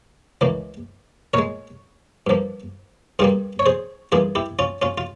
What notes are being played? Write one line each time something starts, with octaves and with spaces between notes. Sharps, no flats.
C#2 C#3 E3 A#3
A#2 G#3 A#4 C#5
G2 F3 A#3
G2 G3 A#3 F4 G#4
C#5
G#4 C5
G2 E3 A#3 F4 G#4
E4 G4
C#4 F4
C#4 F4
F4